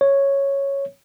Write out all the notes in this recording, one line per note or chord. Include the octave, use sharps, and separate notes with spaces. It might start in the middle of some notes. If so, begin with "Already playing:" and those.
C#5